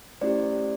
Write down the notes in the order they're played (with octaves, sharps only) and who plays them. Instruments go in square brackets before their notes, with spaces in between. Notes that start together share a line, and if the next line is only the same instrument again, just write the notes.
[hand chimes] A3 C#4 E4 G4 C5 D5